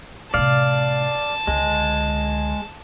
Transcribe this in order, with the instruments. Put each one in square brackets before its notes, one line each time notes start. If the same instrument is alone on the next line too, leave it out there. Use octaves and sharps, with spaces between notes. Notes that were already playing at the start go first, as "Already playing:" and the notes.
[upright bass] A2 C3 [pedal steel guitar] D5 F5 [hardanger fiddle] A5
[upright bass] C#2 D3 [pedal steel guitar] G#3